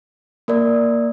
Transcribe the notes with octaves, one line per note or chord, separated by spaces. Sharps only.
A#3 A#4 D5